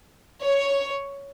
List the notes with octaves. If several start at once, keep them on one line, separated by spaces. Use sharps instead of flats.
C#5